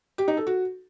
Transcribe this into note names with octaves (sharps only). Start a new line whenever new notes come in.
G4
D#4
A4
F#4